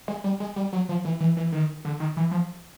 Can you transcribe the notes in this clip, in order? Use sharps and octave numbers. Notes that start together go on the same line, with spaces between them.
G#3
G3
G#3
G3
F#3
F3
E3
E3
E3
D#3
D3
D#3
E3
F3